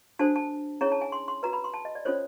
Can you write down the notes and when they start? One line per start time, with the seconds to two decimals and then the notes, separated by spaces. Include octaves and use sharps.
0.19 D4 F#4 A4 C5 A5
0.36 A5
0.81 C#4 E4 G#4 C#5 A#5
0.92 A5
1.01 G#5
1.12 C6
1.28 C6
1.43 F#4 B4 A#5
1.53 B5
1.64 C6
1.74 A5
1.85 D#5
1.95 D5
2.05 C#4 F4 A4 C5 C#5